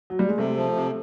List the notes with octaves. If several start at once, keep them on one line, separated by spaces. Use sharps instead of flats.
F#3
G3
G#3
C3 A3
F3
C3